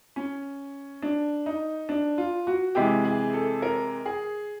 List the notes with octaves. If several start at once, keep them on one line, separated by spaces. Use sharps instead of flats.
C#4
D4
D#4
D4
F4
F#4
C3 E3 G#3 G4
G#4
A4
A#4
G#4